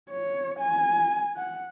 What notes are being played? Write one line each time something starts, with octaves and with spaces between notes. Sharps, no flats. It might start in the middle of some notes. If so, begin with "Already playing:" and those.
C#5
G#5
F#5